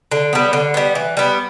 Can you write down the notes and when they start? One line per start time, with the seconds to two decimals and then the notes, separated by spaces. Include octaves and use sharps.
0.11 D3
0.33 G3 B3
0.53 D3
0.74 G3 B3
0.95 E3
1.17 G3 B3